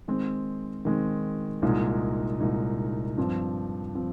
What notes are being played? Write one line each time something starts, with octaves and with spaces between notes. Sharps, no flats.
D#3 G#3 C4
D#3 G#3 C4
C2 A#2 G#3 D#4
C2 A#2 G#3 D#4
G2 F3 C4
F3 C4